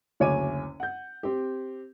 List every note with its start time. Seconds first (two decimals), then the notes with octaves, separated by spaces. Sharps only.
0.20 F#1 D2 C#5 G#5 D6 D#7
0.80 F#5 G6
1.23 C4 G4